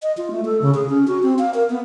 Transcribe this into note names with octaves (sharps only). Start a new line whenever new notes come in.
D#5
F4
A3
A4
C#3
G#4
C#4
F#4
C4
F5
A#4
B3